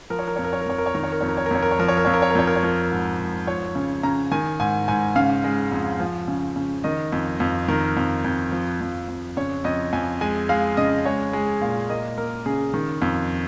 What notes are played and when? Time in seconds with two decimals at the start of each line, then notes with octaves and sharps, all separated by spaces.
0.10 F3 A#4
0.19 C#5
0.28 A#4
0.36 F2 C#5
0.44 A#4
0.53 C#5
0.61 A#4
0.66 F2 C#5
0.78 A#4
0.86 C#5
0.95 D#3 A#4
1.04 C#5
1.12 A#4
1.21 F2 C#5
1.28 A#4
1.37 C#5
1.46 A#4
1.51 F2 C#5
1.62 A#4
1.71 C#5
1.79 F3 A#4
1.88 C#5
1.97 A#4
2.05 F2 C#5
2.14 A#4
2.22 C#5
2.30 A#4
2.35 F2 C#5
2.47 A#4
2.56 C#5
2.63 F3 A#4
2.91 G#2
3.19 G#2
3.47 F3 C#5
3.75 C#3
4.03 C#3 A#5
4.31 D#3 G#5
4.60 G#2 G#5
4.88 G#2 G#5
5.16 C#3 F5
5.44 G#3
5.72 F2
6.00 F3
6.28 C#3
6.56 C#3
6.84 D#3 D#5
7.12 F2
7.40 F2
7.68 D#3 A#4
7.97 F2
8.24 F2
8.52 F3
8.81 F2
9.08 F2
9.37 C#3 C#5
9.64 F2 D#5
9.93 F2 G#5
10.21 G#3 G#5
10.49 G#3 F5
10.77 C#3 D#5
11.05 G#3 C#5
11.33 G#3 G#4
11.62 A#2 F5
11.89 A#3 D#5
12.18 A#3 A#4
12.46 C#3 G#4
12.74 D#3
13.02 F2